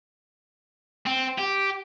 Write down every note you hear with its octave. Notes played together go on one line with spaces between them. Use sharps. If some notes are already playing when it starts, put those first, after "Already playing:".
C4
G4